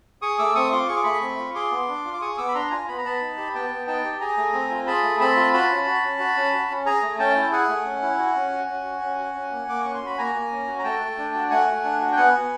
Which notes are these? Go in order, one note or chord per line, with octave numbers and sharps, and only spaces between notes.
G#4 C#6 D#6
A3 D6 E6
C4 C#6 D#6
F4 C6 D6
G#4 C#6
D6
A3 B5 C#6
C4
F4
G#4 C6 D6
B3
D4
F4
D6
G#4 C#6 D#6
B3 D6 E6
B5
D4 A#5 C6
F4 G#5 A#5
B3 B5
A#5
B3 A5 B5
D#4
G4
B3 G5 A5
B3
D#4 G5 A5
G4
G#4 G#5 A#5
A3
C4
F4
G#4 A5 B5
A3
C4 A5 B5
F4
F#4 A5 B5
C#4
F#4
C#4
F#4
C#4
F#4
C#4
G#4 G#5 A#5
A3
C#4 G5 A5
E4
G#4 F#5 G#5
A3
C#4
E4
F#4
C#4
F#4
C#4
F#4
C#4
F#4
C#4
A#3
A#3 D6
C#4 C#6
C6
F#4 B5
A#3 G#5 A#5
A#3
C#4
F#4
A#5
A3 G5 A5
A3
D4
F#4
A3 F#5 G#5
A3
D4
F#4
G5
B3 F#5 G#5
B3